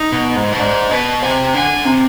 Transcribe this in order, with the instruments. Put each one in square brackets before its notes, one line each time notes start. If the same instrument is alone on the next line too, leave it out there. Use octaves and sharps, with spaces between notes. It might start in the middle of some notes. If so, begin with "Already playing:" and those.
Already playing: [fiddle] D#4
[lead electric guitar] B2
G#2
B2
[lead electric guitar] G#2 [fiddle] D4
[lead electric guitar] B2 [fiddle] B4
[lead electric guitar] C3 [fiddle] G#5
[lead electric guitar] D3 [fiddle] G#5
[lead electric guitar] C3